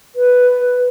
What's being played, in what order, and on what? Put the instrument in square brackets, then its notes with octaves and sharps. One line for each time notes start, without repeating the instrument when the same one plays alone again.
[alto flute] B4